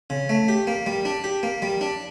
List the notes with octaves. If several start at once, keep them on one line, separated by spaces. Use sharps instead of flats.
C#3
A3
G4
A#3
G3
D4
G4
A#3
G3
D4